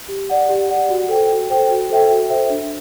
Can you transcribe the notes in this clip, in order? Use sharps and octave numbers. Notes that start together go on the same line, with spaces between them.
G4
D5 F#5
G4
D5 F#5
F#4
A4 C5 G5
F#4
A4 C5 G5
F#4
A4 C5 E5 G5
F#4
A4 C5 E5 G5
D4